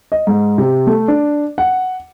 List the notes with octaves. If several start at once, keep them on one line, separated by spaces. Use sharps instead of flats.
D#5
G#2
C3
A3
D4
F#5